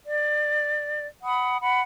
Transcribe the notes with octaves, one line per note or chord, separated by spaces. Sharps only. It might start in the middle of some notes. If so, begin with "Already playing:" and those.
D5
F#5 B5 D#6
F#5 B5